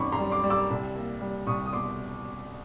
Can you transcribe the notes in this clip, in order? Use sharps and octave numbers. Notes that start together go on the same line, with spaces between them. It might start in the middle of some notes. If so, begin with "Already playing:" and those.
Already playing: F#2 D#3 C4 B5 C#6 D6
A#5 C6
G3
C6 D6
G3
D6 E6
C2
A#3
G3
C2 C#6 D#6
D#6
B2 C6 D6